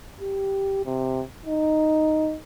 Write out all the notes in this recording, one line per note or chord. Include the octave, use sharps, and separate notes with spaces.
G4
C3
D#4